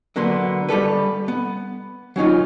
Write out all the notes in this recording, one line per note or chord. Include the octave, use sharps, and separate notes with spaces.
D3 F#3 A#3 B3 C6
G3 G4 A4 B4
B3
F#3 C#4 D#4 F4